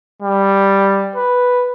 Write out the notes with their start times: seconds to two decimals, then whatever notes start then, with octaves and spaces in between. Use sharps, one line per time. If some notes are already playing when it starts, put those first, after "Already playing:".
0.22 G3
1.16 B4